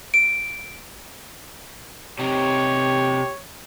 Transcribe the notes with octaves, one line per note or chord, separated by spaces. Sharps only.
D7
C3 D#4 G4 C#5